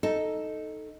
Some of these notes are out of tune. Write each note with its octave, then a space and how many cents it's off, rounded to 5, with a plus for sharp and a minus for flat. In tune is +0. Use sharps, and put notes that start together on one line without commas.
D#4 +0 A4 +0